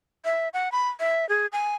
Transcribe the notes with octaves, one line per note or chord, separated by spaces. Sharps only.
E5
F#5
B5
E5
G#4
G#5